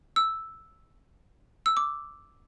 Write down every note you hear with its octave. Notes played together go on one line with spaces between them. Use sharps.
E6
E6
D6